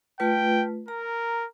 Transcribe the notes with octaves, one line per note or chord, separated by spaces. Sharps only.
A3 F4 B4 G5
A#4 A#5